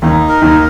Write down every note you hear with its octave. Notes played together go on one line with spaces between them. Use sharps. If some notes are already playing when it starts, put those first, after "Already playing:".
D#2 D#3 D#4
A#4
D#2 D#3